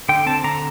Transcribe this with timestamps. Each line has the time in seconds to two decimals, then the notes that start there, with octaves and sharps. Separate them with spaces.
0.09 D3 G5
0.26 C4 A5
0.44 D3 A#5